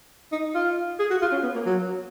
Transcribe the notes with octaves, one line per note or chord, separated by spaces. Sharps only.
D#4
F4
G#4
F#4
F4
C#4
B3
A#3
F#3